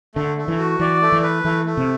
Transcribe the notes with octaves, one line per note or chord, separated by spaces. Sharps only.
D3 A3
A3
E3
F#4
E3 D5
A3
E3
B4
E3 A3
A3
C3